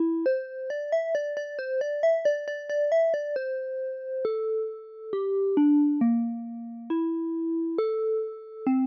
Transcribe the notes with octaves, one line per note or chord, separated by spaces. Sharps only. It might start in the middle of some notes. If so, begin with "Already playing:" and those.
Already playing: E4
C5
D5
E5
D5
D5
C5
D5
E5
D5
D5
D5
E5
D5
C5
A4
G4
D4
A#3
E4
A4
C4